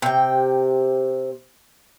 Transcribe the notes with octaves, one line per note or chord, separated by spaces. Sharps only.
C3 G5